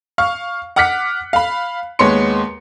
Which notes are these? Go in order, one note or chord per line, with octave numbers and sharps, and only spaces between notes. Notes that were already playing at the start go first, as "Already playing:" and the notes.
F5 C#6 F6
F#5 D6 F6 F#6 B6 C#7
F5 B5
D#2 G#3 B3 C#5 C6 C#7